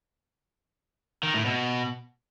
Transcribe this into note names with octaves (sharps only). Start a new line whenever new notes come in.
D#3
A2
B2